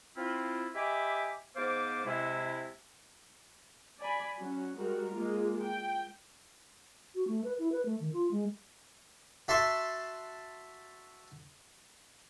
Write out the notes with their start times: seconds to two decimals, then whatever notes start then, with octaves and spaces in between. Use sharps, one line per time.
0.17 C4 E4 F4
0.75 G4 D#5 E5 G#5 B5 D6
1.56 G#2 B3 C5 F5 D6
2.05 C3 G#3 E4
4.00 D5 G#5 B5
4.38 F#3 C#4 F#4
4.77 G3 G#3 F#4 A#4
5.13 G#3 A#3 F4
5.62 G5
7.15 F#4
7.28 A3
7.44 B4
7.59 E4
7.72 B4
7.85 A3
8.00 D#3
8.13 F4
8.31 G#3
9.48 F#4 E5 A5 C6 C#6